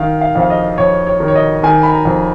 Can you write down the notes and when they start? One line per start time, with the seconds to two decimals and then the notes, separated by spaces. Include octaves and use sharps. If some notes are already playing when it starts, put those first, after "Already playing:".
Already playing: D#3 F5
0.21 F5
0.35 F2 F5
0.50 D#5
0.78 F2 C#5
1.07 C#5
1.20 D#3
1.28 C#5
1.35 D#5
1.63 D#3 G#5
1.83 B5
1.92 A#5
2.05 F2